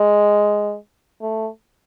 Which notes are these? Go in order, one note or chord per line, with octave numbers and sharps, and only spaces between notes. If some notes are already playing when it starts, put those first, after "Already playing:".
Already playing: G#3
A3